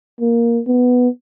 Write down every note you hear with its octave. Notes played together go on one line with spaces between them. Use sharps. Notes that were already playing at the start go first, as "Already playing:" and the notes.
A#3
B3